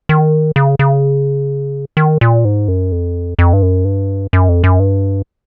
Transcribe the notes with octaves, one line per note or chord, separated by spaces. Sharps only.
D#3
C#3
C#3
D#3
A#2
G#2
F#2
F2
F2
G2
F#2
G2
F#2
F2
F#2
G2